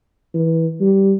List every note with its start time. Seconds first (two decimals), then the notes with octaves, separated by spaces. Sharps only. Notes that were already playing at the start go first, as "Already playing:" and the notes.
0.34 E3
0.81 G3